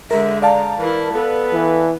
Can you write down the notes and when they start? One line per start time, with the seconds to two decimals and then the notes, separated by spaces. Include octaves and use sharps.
0.11 D3 G#3 A#4 E5
0.42 D5 F5 A5 A#5
0.79 E3 E4 A#4
1.13 B3 A4 B4
1.53 E3